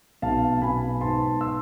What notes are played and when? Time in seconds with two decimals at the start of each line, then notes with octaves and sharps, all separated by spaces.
0.22 B1 F5 A5
0.62 B2 G#5 B5
1.01 G#2 A5 C6
1.41 C6 E6